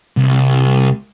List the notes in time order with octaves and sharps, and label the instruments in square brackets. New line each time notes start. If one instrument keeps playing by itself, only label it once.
[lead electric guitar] C2